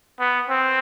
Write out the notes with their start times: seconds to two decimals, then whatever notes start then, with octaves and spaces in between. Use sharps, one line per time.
0.20 B3
0.49 C4